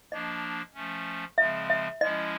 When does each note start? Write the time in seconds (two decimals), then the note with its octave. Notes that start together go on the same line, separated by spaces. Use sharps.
0.12 F3 A#3 D4 D#5
0.74 F3 A3 C#4
1.38 C#3 F3 G#3 C4 E5
1.70 E5
2.01 F3 G#3 C#4 E4 D#5